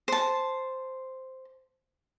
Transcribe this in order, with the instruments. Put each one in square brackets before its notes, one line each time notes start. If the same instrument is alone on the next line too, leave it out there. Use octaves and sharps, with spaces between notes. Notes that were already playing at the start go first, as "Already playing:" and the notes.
[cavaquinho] C5 A5